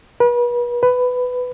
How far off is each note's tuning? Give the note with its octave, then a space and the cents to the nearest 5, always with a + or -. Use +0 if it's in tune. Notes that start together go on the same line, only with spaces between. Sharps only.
B4 -40
B4 +10